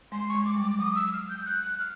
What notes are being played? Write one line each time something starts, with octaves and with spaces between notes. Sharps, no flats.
G#3 C6
C#6
G#3
D6
G3
D6
F#3 D#6
E6
F6
G6
F#6
F6